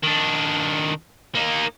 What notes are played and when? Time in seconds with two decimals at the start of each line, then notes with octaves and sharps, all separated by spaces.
0.03 D#3 D4
1.35 A#3 D#4